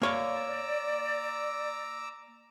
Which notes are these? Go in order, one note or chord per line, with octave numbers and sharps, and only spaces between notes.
A#3 C#5 D5 F5 A#5 D6 E6